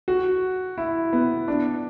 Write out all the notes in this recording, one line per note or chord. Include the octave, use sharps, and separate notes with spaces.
F#4
E4
B3
D4